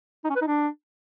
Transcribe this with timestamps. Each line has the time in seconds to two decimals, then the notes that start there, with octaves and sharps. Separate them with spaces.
0.24 D#4
0.30 C#4
0.36 B4
0.41 D#4
0.47 D4